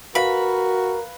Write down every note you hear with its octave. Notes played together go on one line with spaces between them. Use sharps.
F#4 A#4 B4 F5 B5